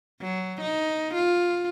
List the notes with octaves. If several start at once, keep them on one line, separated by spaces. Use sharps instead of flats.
F#3
D#4
F4